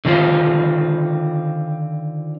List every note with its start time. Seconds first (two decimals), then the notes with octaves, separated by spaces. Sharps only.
0.05 D3 D#3 C4 F4